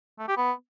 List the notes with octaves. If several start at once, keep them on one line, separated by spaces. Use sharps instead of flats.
A3
G4
B3